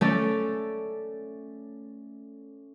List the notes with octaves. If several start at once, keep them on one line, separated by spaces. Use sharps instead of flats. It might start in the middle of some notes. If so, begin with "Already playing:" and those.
A3 C#4 A4 D5